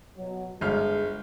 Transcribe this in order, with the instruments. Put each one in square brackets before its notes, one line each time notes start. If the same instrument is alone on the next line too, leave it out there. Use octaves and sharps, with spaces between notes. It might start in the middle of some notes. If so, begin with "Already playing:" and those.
[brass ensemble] B2 F#3
[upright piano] G1 F6 [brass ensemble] G#3